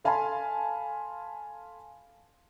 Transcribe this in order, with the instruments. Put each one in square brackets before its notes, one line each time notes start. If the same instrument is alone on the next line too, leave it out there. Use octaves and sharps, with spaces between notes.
[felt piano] A4 F5 G#5 A5 B5 C6